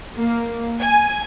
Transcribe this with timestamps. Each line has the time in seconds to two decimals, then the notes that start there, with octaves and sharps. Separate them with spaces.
0.17 A#3
0.80 G#5